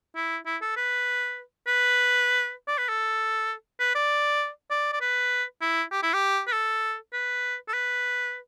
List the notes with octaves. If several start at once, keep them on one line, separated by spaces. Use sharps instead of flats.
E4
E4
A4
B4
B4
D5
B4
A4
B4
D5
D5
D5
B4
E4
G4
E4
G4
B4
A4
B4
A4
B4